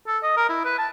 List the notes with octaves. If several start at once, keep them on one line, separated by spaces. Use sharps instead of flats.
A4
D#5
A#4
E4
B4
A5